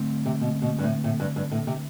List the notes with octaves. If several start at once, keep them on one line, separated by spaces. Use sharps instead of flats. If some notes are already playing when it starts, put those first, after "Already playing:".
Already playing: D3 A3 C4
C3
B2
B2
G2
A2
A2
G2
G2
A2
C3